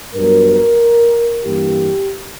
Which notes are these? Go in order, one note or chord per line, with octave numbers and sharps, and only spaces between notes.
G2 F#3 B3 A#4
G2 E3 A#3 G4